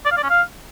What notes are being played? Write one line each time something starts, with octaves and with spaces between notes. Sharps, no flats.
D5
F5
D5
C#4
F5